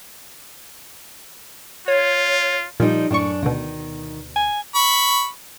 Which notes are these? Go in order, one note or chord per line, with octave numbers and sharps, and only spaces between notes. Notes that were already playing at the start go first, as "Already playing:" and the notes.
F4 C#5
A#2 F3 G3 D#4
F#2 A2 D4 C#6
D2 B2 D#3
G#5
B5 C#6